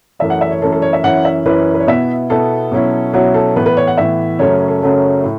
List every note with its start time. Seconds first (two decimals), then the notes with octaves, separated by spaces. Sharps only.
0.19 F#2 E3 A3 C#4 E5
0.30 F#5
0.41 E5
0.51 C#5
0.62 F#2 E3 A3 C#4 A4
0.72 A4
0.82 C#5
0.93 E5
1.03 F#2 E3 C#4 E4 F#5
1.25 E5
1.46 F#2 E3 C#4 E4 B4
1.74 B4
1.80 C#5
1.87 B2 B3 E4 E5
2.30 B2 B3 E4 A4
2.72 B2 F#3 C#4 E4
3.13 B2 F#3 C#4 E4 F#4
3.34 A4
3.55 A2 E3 B3 B4
3.66 B4
3.77 C#5
3.87 F#5
3.98 A2 E3 B3 E5
4.39 F#2 C#3 F#3 A3 C#4 C#5
4.68 A4
4.82 F#2 C#3 F#3 A3 C#4
5.24 A2